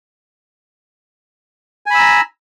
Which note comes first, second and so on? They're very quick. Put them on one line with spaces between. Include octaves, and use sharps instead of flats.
G#5 B5 E6 A#5